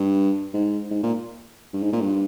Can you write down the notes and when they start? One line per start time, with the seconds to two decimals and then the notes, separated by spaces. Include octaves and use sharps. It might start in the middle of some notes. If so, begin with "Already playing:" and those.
Already playing: G2
0.53 G#2
0.90 G#2
1.03 A#2
1.73 G2
1.82 G#2
1.92 A#2
2.01 G2